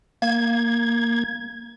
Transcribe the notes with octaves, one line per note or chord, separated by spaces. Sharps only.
A#3 G#6